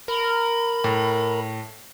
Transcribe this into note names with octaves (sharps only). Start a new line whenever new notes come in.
A#4 B5
A2